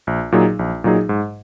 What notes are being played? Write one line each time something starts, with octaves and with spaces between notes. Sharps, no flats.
A#1
A#2 F#3 D#4 G#4
A#1
A#2 F#3 D#4 G#4
G#2